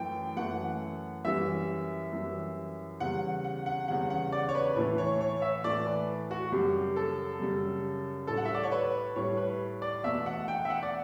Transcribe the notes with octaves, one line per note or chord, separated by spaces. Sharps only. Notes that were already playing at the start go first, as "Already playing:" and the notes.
Already playing: F#2 E3 A3 G5
F#2 E3 A3 F#5
F#2 E3 G3 E5
F#2 E3 G3
E2 C#3 G3 F#5
F#5
F#5
E2 C#3 G3 F#5
F#5
D5
C#5
B4
A2 E3 A3 B4
C#5
C#5
E5
A2 E3 A3 D5
B4
F#4
F#2 C#3 G3 G4
A4
F#2 C#3 G3
A2 G3 A4
F#5
E5
D5
C#5
B4
A2 G3 C#5
B4
D5
E2 B2 A3 E5
F#5
G5
E5
F#5
D5